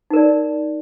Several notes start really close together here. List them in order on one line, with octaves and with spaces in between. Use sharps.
D#4 A#4 D5